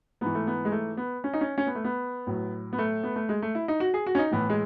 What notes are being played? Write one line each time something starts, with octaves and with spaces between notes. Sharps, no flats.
G#2 E3 B3
A3
B3
G#3
A3
B3
C#4
D#4
C#4
C#4
B3
A3
B3
A2 F#3
B3
A3
B3
A3
G#3
A3
E4
D#4
F#4
G#4
F#4
C#4
D#4
A2 E3 B3
G#3